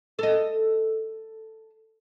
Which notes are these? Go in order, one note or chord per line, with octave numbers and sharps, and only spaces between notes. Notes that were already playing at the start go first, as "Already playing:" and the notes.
A4 D#5